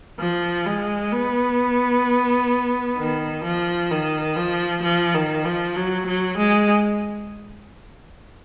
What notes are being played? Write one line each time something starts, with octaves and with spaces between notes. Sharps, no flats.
F3
G#3
B3
D#3
F3
D#3
F3
F3
D#3
F3
F#3
F#3
G#3